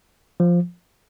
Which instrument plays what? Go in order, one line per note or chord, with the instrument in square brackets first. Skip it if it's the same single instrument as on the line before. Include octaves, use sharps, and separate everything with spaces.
[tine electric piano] F3